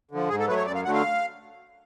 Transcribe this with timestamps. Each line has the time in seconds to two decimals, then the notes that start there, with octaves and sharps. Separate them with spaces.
0.11 D3 F3
0.29 G#2 G#4
0.39 A4
0.48 F#3 A3 B4
0.57 C#5
0.66 F#2 D5
0.75 F5
0.85 D3 F#3 A3 F#5
0.94 F5